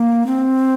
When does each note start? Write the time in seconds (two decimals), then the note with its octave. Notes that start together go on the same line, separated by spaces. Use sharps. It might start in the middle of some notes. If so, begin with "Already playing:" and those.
Already playing: A#3
0.27 C4